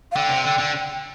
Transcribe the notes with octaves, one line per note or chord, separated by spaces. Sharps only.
F5
D3 G5
C3
D3
D3